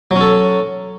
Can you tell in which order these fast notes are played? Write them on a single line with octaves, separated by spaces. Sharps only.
F#3 C#4 A4